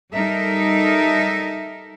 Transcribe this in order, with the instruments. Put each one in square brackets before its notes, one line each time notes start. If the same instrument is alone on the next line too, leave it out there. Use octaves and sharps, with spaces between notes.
[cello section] G3 D#4 A4 A#4 E5